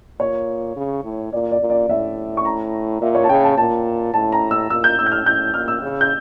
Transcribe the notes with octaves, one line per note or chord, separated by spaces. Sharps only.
A#2 C#5
C#3
A2
A#2 D5
D5
A#2
D5
A2 E5
C#6
A#5
A#2 E5
C#5
A5
C#3 G5
A5
A#2 A5
A2 A5
A#5
E6
A#2 E6
G6
A2 E6
G6
F6
A2 G6
A#2 F6
E6
C#3
G6